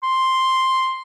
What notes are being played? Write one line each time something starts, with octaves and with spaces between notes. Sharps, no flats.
C6